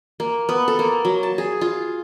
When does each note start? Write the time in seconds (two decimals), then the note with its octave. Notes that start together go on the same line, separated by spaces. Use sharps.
0.20 A#3
0.49 B3
0.68 A4
0.79 A#3
1.05 F#3
1.23 A5
1.38 G#4
1.61 F4